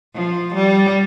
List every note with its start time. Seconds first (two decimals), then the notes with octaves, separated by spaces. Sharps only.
0.14 F3
0.54 G3